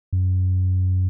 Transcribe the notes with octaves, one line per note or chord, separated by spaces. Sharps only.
F#2